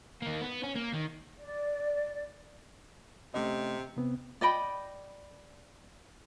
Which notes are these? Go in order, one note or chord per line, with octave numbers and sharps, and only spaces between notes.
D#3 A#3
B3
C#4
A#3
D#3
D5
C3 A3 C#4 D#5
C3 B3 C4
D5 D#5 G5 B5